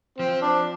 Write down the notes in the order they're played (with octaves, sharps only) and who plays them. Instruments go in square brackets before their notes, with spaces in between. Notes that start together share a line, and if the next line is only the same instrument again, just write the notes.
[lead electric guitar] F3 [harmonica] C4
[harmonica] D4